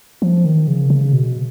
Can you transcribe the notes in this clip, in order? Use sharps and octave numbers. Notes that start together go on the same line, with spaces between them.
F3
D#3
C#3
C#3
B2